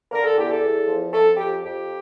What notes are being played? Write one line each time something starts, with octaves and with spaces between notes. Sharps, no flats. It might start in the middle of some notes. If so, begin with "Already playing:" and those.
D3 A#4
A4
E2 G4
A4
E2
F3
F2 A4
F2 G4
F2 G4